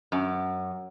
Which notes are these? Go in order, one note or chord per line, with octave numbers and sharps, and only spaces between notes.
F#2